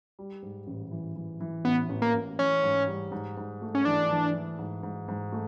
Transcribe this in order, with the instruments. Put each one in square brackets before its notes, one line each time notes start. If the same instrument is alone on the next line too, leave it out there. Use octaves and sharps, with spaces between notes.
[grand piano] G3
G#2
A1
E3
E3
E3
[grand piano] A1 [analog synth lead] B3
[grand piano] A1
[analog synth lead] A#3
[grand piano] A1
[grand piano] E3 [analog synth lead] C#4
[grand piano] G#2
G3
G#2
G#2
A3
[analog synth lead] C#4
[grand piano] E3 [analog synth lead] D4
[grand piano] E3
E3
G#2
G#2
G#2
A3